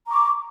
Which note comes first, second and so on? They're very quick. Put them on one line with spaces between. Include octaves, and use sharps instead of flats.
A#5 D6 C#6